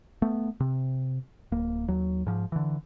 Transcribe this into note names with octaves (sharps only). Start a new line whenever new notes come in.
A3 B3
C3
D1 A#3
D#2 F#3
G#2 F3
D3 E3